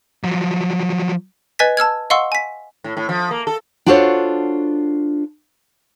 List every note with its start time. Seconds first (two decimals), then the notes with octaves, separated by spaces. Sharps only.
0.24 F3 F#3
1.59 B4 D#5 G#5 G#6 A6 B6
1.77 A5 E6 F6 G#6
2.10 D#5 F5 F#5 C6 C#6 E6
2.32 G#5 B6
2.84 A2
2.97 A2
3.09 F3
3.31 A#3
3.47 A4
3.86 D4 F4 F#4 A4 C5 C#5